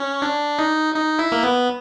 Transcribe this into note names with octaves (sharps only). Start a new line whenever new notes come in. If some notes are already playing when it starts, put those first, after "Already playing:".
Already playing: C#4
D4
D#4
D#4
E4
A#3
B3